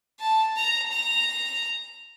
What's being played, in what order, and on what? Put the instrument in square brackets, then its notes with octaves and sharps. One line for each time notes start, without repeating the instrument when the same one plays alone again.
[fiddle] A5
A#5
A#5